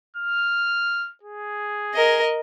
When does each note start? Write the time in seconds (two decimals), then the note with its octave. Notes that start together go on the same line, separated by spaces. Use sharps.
0.16 F6
1.23 G#4
1.94 A#4 D#5